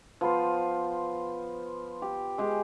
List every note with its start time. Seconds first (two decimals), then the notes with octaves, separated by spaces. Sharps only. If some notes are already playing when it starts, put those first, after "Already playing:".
0.21 F3 B3 C5
2.02 G4
2.38 G#3 G4 G#4